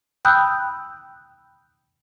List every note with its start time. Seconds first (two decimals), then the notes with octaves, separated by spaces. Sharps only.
0.25 G5 B5 D#6 E6 F#6 G6